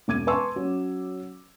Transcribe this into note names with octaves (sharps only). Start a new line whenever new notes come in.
E1 D6 G#6 D#7
B4 G#5 A5 C6 C#6 E6
F#3 C#4